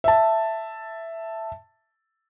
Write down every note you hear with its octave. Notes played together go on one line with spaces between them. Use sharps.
E5 A5